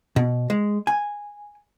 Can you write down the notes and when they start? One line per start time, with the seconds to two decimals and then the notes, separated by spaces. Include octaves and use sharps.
0.16 B2
0.50 G#3
0.87 G#5